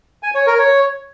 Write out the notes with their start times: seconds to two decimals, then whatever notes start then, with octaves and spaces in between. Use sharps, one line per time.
0.23 G#5
0.35 C#5
0.47 A#4
0.59 C#5